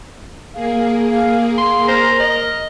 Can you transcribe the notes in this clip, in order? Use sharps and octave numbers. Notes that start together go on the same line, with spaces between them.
A#3 G#4 F5
F5
F5 C6
A#4 C5 A#5
D#5